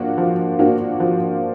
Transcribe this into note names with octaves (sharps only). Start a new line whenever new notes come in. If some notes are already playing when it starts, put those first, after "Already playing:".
Already playing: F3 A#3 D4 F#4
F3
A#3 D4 F#4
F3